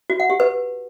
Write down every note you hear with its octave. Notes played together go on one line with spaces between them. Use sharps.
F#4
F#5
G4
B4